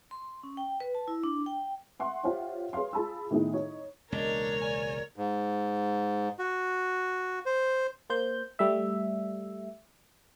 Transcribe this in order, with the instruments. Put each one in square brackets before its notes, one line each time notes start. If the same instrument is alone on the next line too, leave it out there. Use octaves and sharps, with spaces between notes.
[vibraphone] C6
C#4
G5
B4
A5
E4
D4
G5
[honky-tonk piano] E5 F#5 C6 C#6
F4 G4 C5 C#5 E5 F#5
G#4 B4 C#5 F5 C6
F4 G#4 A5 B5 E6
A2 D#3 B3 D#4 E4 G#4
D#4 C#5
[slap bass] E1 C#2 A#3 [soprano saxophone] D4 [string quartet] A#4 C#5 [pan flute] D#5
[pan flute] D5 [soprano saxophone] G#5
[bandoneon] G#2
F#4
C5
[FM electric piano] A#3 C5 G6
G3 A3 E5